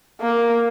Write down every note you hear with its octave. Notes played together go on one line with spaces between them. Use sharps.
A#3